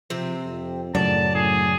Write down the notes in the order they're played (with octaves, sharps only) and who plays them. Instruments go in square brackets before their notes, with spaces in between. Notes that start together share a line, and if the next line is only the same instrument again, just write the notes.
[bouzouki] C3 C4 [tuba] F3
[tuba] F2
[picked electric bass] F#2 C#3 F#3 [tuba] A2 [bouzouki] D5 [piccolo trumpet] A5
[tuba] A2 [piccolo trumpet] G#4